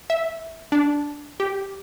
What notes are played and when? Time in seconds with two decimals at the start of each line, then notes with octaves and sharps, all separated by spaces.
0.10 E5
0.72 D4
1.40 G4